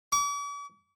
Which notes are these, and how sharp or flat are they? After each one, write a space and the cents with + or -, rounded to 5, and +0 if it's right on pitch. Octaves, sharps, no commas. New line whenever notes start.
D6 -45